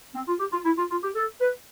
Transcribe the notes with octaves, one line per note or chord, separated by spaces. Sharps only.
C4
F4
G4
F4
E4
F4
F4
G4
A4
B4